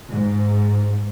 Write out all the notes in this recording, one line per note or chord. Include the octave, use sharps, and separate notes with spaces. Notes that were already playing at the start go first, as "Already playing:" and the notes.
G#2